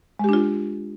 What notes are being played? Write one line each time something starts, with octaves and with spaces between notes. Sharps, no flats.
G#3 D4 F4 G4